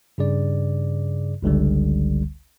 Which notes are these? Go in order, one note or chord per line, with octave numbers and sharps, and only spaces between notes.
G2 C#3 G#4 D5
G1 C#2 D3 G3